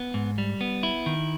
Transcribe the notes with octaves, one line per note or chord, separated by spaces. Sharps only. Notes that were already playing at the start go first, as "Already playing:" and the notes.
Already playing: B3
G#2
G3
B3
E4
D#3